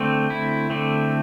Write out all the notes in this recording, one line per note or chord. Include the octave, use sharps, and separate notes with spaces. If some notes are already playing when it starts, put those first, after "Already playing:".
Already playing: D3 A3 C4
E4
D3 A3 C4